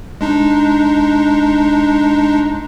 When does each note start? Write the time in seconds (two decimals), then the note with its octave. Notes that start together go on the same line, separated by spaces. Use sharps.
0.21 G#3 D4 D#4